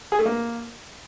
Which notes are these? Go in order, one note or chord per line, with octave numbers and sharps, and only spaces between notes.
G#4
A3
A#3